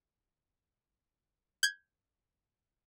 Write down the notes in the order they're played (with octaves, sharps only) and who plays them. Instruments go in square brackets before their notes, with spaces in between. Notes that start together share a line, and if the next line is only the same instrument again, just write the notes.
[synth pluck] G6 G#6